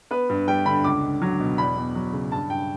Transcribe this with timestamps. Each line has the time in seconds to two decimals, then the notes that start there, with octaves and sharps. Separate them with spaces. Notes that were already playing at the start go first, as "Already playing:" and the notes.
0.11 B3 B4
0.29 G2
0.48 G3 G5
0.66 D3 B5
0.84 C#2 D6
1.03 C#2
1.22 F#3
1.40 B2
1.58 E2 B5
1.76 E2
1.95 F#3
2.13 C#3
2.32 G2 A5
2.50 G2 G5